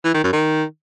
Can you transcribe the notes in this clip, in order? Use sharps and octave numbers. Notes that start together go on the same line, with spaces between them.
E3
D#3
F#2
D#3